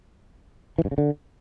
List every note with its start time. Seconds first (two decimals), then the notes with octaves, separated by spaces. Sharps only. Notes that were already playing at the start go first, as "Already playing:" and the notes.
0.78 E3
0.85 G2
0.91 C#3
0.98 D3